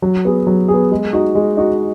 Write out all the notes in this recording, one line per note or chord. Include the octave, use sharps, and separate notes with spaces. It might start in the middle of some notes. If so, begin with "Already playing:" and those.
F#3
B3 G#4
F#3
G#4
B3
G#3
D#4 F#4
G#3
D#4 F#4